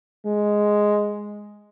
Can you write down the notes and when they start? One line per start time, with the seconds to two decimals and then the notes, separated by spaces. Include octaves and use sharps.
0.26 G#3